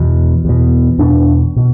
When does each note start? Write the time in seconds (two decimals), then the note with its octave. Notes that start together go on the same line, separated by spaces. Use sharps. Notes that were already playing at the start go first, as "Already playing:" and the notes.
Already playing: E2 B2
0.45 E2 B2
0.98 E2 B2 D4
1.56 B2